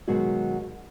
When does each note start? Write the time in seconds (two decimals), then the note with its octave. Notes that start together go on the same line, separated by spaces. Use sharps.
0.08 B2 D#3 F#3 G#3 F#4